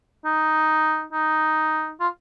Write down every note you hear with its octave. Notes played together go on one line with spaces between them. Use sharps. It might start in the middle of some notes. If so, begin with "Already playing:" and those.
D#4
D#4
F4